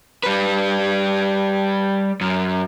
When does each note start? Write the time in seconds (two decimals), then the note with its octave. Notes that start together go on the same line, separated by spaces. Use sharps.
0.23 G3 B4
2.21 F#2